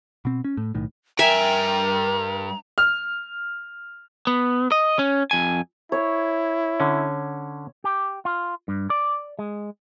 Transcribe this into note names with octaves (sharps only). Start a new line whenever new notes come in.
B2 C4
C#4
A2
B1 A2 D#3
G2 A#4 E5 G5 G#5 A#5
F6
B3
D#5
C#4
F2 G#5
E4 C#5
D3 C#4
G4
F4
G2
D5
G#3